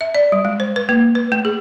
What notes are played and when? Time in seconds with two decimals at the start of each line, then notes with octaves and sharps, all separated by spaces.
0.01 E5
0.15 D5
0.32 G3
0.45 G#3
0.60 C5
0.76 B4
0.89 A#3
1.15 B4
1.32 A3
1.45 G#4